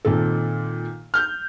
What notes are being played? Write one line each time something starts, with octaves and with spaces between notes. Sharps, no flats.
A#2 D#3 C4 A4
F6 G6